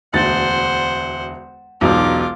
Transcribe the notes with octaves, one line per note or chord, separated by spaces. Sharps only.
E1 D2 C5 F#5 A6
E1 B1 D#4 F4 D6